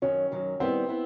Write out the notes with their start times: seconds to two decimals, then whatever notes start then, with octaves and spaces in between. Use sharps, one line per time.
0.02 F#2 D#3 F#3 C#4
0.31 F#2 D#3 F#3
0.60 D#3 G3 B3 C4 E4
0.89 B3 E4